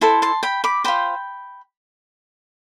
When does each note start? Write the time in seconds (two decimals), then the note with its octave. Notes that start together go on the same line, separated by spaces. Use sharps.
0.01 E4 A4 C5 A5 C6
0.22 A5 C6
0.43 G5 B5
0.64 B5 D6
0.84 F4 C5 G5 B5